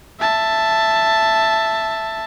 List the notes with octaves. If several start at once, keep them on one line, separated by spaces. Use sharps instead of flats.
E5 A5